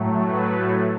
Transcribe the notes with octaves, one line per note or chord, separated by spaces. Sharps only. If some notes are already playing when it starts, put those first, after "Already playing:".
Already playing: A2 F#3 A3
B4